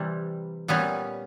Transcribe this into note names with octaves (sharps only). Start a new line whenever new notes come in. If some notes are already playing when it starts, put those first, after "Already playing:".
Already playing: C3 E3 G3
A#2 G3 B3 C#4